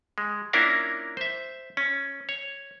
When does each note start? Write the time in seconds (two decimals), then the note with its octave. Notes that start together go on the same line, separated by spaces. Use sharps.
0.18 G#3
0.53 A#3 C#4 D4 E4 F4 A#4
1.17 C5 E5
1.77 C#4
2.29 C#5